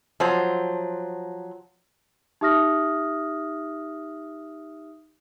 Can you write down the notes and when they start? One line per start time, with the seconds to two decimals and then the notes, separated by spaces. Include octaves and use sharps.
0.20 F3 F#3 C5
2.41 D#4 G4 E5 D#6 F6 A#6